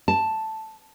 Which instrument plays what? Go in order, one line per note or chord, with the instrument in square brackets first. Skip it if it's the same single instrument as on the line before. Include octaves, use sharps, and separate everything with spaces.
[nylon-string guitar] A5